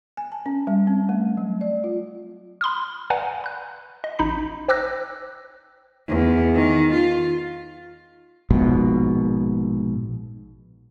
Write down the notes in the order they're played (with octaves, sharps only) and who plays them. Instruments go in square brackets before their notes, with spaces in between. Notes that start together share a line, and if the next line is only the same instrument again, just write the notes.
[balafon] G#5
A5
C#4
G3
C4
A3
F#3
D5
F4
[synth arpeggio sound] B5 C6 D#6 F6
B4 D5 F5 F#5 G#5 A#5
B5 F#6
D#5
A1 D#4 B5 B6
C5 G5 D6 E6 F#6 A#6
[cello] E2
D#3
F4
[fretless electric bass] A#1 G#2 B2